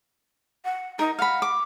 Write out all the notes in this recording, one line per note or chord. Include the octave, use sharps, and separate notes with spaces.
F#5
D#4 A#4
F5 F#5 B5
D6